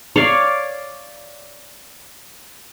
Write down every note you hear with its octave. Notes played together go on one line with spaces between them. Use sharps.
C#5 D5 F5